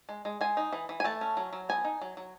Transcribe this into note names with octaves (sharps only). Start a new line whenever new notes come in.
G#3
G#3
G#3 G#5
D#4
E3
E3
G#5
A3 A5
C#4
F#3
F#3
B3 G#5
D#4
F#3
F#3